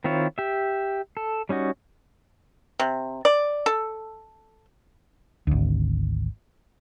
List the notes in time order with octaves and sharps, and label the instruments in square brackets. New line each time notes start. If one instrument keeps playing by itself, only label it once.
[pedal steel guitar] D#3 C4 E4 F4 C#5
G4 E5
A4
G3 C#4 D#4 F#4
[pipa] C3
D5
A4
[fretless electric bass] G#1 D2